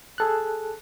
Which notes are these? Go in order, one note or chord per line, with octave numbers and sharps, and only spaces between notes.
G#4 A4 F#6